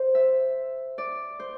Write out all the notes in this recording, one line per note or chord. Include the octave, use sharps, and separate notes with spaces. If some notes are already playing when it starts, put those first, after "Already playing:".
Already playing: C5
E5
D5
C5